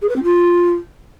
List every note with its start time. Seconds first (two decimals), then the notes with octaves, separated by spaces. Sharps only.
0.02 G#4
0.09 B4
0.16 C4
0.23 F4